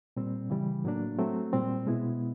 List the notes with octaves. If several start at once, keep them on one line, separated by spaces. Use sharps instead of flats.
A#2 G3 C4
C#3 E3 G3
A2 F#3 A#3 D4
F#3 A3 C4
A#2 G3 C4
B2 G#3 B3 E4